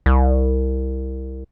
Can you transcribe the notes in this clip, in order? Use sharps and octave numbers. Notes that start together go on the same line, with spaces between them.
C2